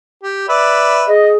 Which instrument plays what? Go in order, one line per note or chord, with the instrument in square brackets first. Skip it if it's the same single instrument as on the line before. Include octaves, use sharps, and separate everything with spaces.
[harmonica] G4
B4 D5 E5
[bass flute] G#4 [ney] D#5